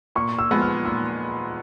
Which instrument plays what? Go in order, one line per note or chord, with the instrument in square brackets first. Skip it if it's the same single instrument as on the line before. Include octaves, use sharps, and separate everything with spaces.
[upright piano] A#2 [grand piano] C#6
[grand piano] E6
[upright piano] F3 G#3 B3
[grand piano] F6
[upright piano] A#2 [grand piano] E6